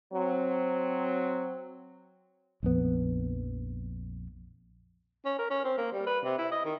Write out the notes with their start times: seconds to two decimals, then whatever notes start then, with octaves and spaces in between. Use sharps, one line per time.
0.13 F#3 C4
2.63 A#1 F2 B3
5.25 C#4
5.39 A#4
5.50 C#4
5.64 C4
5.78 A#3
5.92 G3
6.07 B4
6.25 C3
6.38 E4
6.52 D#5
6.65 D#3